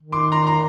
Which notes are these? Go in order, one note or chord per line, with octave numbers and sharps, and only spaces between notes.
D#3
C6 D6
A#5 C6
A#5 C6